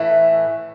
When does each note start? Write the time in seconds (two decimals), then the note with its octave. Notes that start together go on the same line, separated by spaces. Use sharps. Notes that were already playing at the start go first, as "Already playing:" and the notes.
Already playing: A2 E3 A3